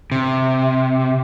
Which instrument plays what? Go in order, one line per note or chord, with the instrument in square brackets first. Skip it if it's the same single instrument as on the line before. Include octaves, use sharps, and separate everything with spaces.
[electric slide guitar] C3